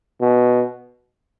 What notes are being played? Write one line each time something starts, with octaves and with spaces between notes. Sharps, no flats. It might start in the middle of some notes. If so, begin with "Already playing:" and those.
B2